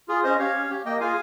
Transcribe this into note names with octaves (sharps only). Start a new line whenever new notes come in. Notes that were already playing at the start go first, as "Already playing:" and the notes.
F4 G#4
C#4 C5 D#5
G4 C#5 F5
C#4
G4
A#3 D#5 G5
F4 G#4 F5 G#5